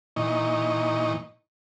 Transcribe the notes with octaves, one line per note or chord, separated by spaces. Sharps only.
A#2 E3 D#4 D#5 C#6